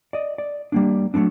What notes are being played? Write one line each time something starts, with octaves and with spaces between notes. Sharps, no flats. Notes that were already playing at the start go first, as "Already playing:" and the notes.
D5 D#5
D5
G3 A#3 D4
F#3 A3 A#3 C4 D4